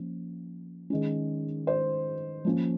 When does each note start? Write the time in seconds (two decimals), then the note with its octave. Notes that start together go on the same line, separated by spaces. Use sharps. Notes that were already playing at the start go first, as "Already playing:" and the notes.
Already playing: F3 A#3 C#4
0.90 D#3 G#3 C#4
1.67 C5
2.45 F3 A#3 C#4